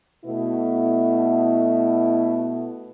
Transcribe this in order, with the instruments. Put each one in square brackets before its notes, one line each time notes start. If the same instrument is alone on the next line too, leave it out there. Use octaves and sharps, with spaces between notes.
[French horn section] B2 A3 B3 E4